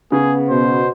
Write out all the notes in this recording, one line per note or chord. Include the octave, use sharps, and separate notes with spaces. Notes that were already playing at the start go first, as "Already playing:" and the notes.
C#3 B3 G#4
B2 C5